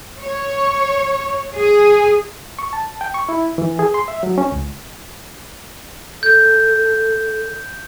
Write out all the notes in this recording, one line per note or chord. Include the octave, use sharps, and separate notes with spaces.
C#5
G#4
C#6
A5
G5
C#6
E4
E3
G#4
C6
E5
F#3
C#4
C#2
A4 G6